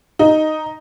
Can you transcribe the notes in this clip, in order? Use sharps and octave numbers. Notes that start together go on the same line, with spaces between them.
D#4